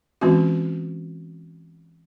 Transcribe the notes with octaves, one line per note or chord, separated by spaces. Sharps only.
E3 G#3 C4 C#4 F4 F#4